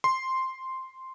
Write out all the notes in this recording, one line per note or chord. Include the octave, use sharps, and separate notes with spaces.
C6